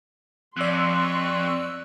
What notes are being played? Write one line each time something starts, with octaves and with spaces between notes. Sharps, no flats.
F2 D5 C6 C#6 E6 F#6